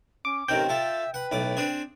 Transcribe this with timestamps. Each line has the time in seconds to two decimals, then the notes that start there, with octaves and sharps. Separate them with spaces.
0.25 C#4 D6
0.48 A1 D#3 C4 A#4 G5
0.69 F3 A4 E5
1.14 B4 F#5
1.32 B1 A2 D6
1.57 C4 D4 G#4